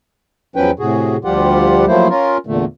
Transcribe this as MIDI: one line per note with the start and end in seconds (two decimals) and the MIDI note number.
0.56 0.71 40
0.56 0.71 53
0.56 0.71 54
0.56 0.71 61
0.56 0.71 71
0.56 0.71 79
0.79 1.17 45
0.79 1.17 48
0.79 1.17 66
0.79 1.17 68
1.25 1.85 38
1.25 1.85 53
1.25 1.85 55
1.25 1.85 65
1.25 1.85 67
1.25 1.85 78
1.87 2.08 53
1.87 2.08 54
1.87 2.08 57
1.87 2.08 58
1.87 2.08 64
1.87 2.08 72
2.10 2.37 61
2.10 2.37 65
2.10 2.37 70
2.47 2.65 40
2.47 2.65 46
2.47 2.65 50
2.47 2.65 57